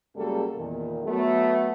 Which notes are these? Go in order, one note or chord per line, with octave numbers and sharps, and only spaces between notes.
F#2 C#3 G3 G#3 A#3 A4
E2 A#2 D#3
F#3 A3 B3